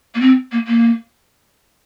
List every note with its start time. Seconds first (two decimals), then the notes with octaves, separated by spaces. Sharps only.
0.15 A#3
0.20 C4
0.52 A#3
0.67 A#3